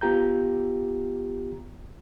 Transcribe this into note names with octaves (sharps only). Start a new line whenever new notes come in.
B3 F4 G4 A#5 G6